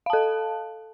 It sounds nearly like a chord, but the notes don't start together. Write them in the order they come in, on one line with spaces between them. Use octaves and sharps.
F5 A5 A4